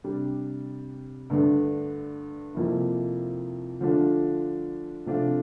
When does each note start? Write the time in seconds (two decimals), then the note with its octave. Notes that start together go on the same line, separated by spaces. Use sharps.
0.04 C3 G3 D4
1.30 G2 D3 A3 D4
2.55 F2 C3 F3 A#3 E4
3.80 D3 F3 A3 D4 F4
5.06 C3 F3 A3 D4 F4